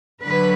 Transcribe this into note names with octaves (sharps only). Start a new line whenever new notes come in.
D3 F#3 B4